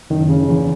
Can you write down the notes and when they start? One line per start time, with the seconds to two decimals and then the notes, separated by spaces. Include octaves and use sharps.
0.10 F#1 D#3
0.29 C#3
0.49 E2 E3